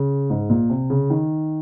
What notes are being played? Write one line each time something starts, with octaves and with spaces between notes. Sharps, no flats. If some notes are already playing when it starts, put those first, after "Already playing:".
Already playing: C#3
G#2
A#2
C3
C#3
D#3